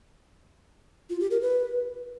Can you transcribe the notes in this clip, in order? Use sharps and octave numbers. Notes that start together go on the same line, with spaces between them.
F4
G4
A#4
B4